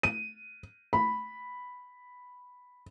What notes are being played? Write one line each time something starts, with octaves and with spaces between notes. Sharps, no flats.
D#7
B5